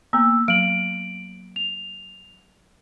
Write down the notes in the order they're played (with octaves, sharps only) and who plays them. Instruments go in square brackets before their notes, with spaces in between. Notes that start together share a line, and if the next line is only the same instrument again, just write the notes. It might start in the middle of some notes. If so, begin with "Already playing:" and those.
[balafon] A#3 B3 [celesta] E6
[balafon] F#3 [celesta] D7 F#7
[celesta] F7